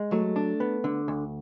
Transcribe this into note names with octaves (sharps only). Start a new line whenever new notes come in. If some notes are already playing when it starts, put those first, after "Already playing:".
Already playing: G#3
F#3 A3
D4
B3
D3
D2